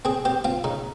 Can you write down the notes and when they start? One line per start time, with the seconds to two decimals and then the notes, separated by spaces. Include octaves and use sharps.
0.05 C4 G#4
0.25 C4 G4
0.45 C4 F4
0.64 C#3 D#4